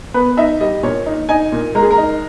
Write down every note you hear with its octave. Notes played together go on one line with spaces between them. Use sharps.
B3 B4
D#4 E5
G3 D#5
A#2 C#5
D#4
D#4 G#5
A#2
G#3 A#4
G#4
A#4
D#4